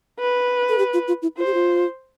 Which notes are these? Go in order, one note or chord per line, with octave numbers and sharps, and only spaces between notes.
B4
A4
G4
F4
F4
E4
F4 C5
G4
F4